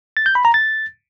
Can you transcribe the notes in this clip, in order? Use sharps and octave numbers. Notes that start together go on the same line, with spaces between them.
A6
G6
B5
A#5
A6